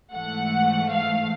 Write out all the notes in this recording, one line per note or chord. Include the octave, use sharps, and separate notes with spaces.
G#2 E3 A3 F#5
F5